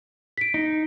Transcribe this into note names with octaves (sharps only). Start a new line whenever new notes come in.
B6 D7
D#4